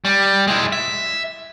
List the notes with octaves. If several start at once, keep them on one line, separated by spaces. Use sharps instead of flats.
G3
G#3 E4
E5